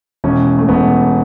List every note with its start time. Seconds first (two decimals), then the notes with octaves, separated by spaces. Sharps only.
0.24 E1 C#4
0.58 A3
0.69 E1 B3